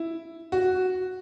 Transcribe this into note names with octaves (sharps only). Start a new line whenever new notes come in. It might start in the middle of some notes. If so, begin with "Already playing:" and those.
Already playing: E4
F#4